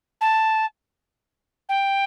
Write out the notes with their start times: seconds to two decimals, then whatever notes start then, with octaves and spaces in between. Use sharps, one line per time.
0.21 A5
1.69 G5